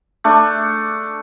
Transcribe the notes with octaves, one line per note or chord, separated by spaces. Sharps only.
A3 D4